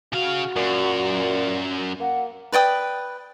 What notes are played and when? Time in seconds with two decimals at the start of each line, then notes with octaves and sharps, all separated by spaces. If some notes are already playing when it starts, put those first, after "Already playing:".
0.13 C#3 F#4 F5
0.56 F#2 A#2
2.00 A#3 F#5
2.52 B4 D5 G5 D#6